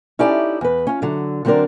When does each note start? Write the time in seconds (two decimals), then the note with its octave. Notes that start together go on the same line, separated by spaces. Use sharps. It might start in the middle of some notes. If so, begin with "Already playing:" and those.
0.19 C#4 D#4 E4 G4 A4 D5
0.61 E2 B4
0.87 C#4 F4
1.02 D3 F#3
1.45 D3 F#3 C4 D4 A#4 D5